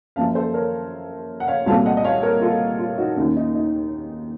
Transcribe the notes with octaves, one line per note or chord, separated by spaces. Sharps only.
F#2 F3 A#3 C#4 F5 A5
A4 C5
A#4 C#5
F#5
C#5 F5
C2 A#2 F#3 A3 C4 F5 A5
D#5 F#5
D#5
C#5 F5
A#4 C#5
F4 A4
F4
D#4 F#4
D#2 D#3 A#3 C#4 D#4
D#4
D#4